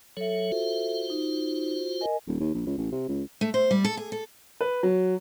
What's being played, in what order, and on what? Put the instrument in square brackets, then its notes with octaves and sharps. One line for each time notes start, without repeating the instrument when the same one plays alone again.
[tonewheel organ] F#3 C#5 [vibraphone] A4 E5
[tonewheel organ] F4 F#4 C5
[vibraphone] D#4
A#4 D#5 G#5
[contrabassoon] D#1
D#2
A#1
C#2
A1
C3
C#2
[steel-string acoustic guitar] A3
C5
G3
A4
G#4
A4
[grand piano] B4
F#3